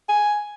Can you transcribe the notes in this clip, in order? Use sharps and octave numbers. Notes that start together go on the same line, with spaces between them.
G#5